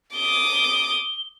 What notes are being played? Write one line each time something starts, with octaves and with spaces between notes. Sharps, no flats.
D6 D#6 G7